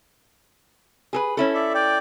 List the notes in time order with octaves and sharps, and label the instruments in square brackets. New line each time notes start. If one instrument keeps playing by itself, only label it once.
[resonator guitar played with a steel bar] G#4 A4 B4
C#4 E4 A4
[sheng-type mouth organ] D5 E5
D5 G5